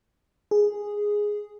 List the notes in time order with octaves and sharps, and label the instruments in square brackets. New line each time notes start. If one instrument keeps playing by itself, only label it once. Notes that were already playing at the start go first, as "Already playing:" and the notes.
[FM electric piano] G#4